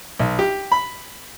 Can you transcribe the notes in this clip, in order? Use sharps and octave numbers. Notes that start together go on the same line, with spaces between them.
B1
G4
B5